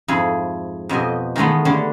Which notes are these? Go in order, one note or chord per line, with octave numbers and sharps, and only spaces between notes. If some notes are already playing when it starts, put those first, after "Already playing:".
F2 G#2 E4 G#4
F2 B2 G4 D#5 G#5
D#3 E3 G#3 A3 B3
D3 G3 D4 C#5